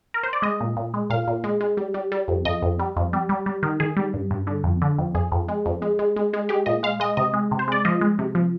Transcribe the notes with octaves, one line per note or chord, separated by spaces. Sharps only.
A#4
C5
D5
G#3 D#5
A#2
A#2
G#3
A#2 F5
A#2
G#3
G#3
G3
G3
G3
F2
F2 D#5
F2
G3
F2
G3
G3
G3
D#3
D#3 G#4
G3
G2
G2
D3
F2
D3
F2
F2 G#4
F2
G#3
F2
G#3
G#3
G#3
G#3
G#3 G4
A#2 D#5
G#3 F5
G#3 D#5
C3 D#5
G#3
C3
C5
G#3 D5
F3 D#5
G#3
C3
F3